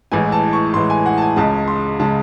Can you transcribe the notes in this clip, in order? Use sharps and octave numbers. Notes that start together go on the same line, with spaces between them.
A1 A2 E3 G#3 G#5
A5
C#6
A1 A2 E3 G#3 C6
G#5
F#5
A5
G#5
C#2 C#3 G#3 A5
C6
C#3 G#3 A5